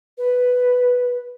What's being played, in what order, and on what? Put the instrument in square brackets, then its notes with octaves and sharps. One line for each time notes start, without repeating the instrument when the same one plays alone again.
[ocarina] B4